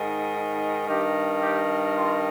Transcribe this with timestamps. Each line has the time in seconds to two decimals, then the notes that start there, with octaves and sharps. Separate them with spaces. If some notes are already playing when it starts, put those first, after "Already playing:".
Already playing: G#2 D#3
0.87 G2 D#3 G4
1.42 G4
1.96 F4